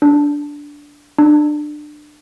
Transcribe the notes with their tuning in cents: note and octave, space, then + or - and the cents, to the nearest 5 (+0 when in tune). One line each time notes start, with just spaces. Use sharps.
D4 -10
D4 +25